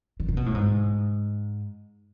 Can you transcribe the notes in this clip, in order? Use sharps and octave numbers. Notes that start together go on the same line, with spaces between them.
D3
C3
B2
A2
G#2